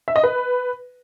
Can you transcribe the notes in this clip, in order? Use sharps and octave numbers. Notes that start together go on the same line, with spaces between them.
E5
D#5
B4